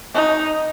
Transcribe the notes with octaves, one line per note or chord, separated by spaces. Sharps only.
D#4